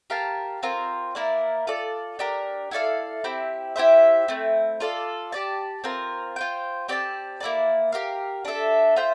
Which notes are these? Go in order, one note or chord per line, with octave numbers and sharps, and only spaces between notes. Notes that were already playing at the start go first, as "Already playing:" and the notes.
G4 A#4 F5 A5
C4 F4 A#4
A#3 E4 A#4 D5
F4 A4 D5
D4 G4 A#4
E4 A4 D5 F5
C4 E4 G4
E4 G4 C5 E5
A3 C4 E4
F4 A4 D5 F5
G4 D5 A5
C4 F4 A#4
F4 C5 G5
C4 G4 D5 A5
A#3 E4 A#4 D5
G4 A#4 F5
D4 A4 E5
F4 C5 E5 G5